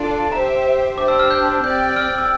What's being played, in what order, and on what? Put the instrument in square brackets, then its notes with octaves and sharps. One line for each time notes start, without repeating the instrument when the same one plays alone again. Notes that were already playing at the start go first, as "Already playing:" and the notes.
Already playing: [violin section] D4 F4 A4 D5
[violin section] G4 C5 E5 [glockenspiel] A#5
[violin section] D4 G4 C5 [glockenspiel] D6
[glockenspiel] E6
F6
G6
G6
[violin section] C4 G4 D5 G5 [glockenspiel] G6
[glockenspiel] F6
E6